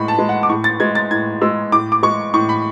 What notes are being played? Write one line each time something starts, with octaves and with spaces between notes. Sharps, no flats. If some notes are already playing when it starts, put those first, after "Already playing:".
Already playing: A2 G#3 B5 C#6
A5
G#3
F#5
D6
A2 C#6
A6
G#3 G#6
A6
A2 G#6
G#3 E6
A2 D6
D6
G#3 C#6
A2 C#6
B5